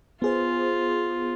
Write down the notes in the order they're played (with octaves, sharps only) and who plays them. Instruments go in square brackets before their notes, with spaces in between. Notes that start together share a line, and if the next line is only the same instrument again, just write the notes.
[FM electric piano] B3 G#4 C5 [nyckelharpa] F4